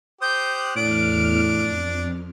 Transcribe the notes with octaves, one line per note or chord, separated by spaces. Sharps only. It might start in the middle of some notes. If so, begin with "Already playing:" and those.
G4 C5 D#6 F#6 G6
E2 A2 D4 F6 D7
F2